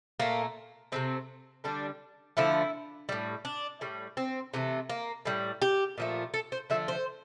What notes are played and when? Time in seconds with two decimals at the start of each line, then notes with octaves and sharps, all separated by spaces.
0.20 A#2 A3 A#3
0.92 C3 F3 A3 C4
1.64 D3 G3 D4
2.37 D3 F3 A3 E4
3.09 A2 G3
3.45 D4
3.81 A2 G3
4.17 C4
4.54 C3 E3 A3
4.90 A#3
5.25 A2 G3
5.62 G4
5.98 A#2 F3 A3
6.34 A4
6.52 C5
6.70 D3 F3 A3 E5
6.88 C5